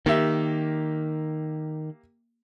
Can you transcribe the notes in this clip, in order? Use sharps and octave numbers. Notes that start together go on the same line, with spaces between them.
D#3 A#3 G4 E5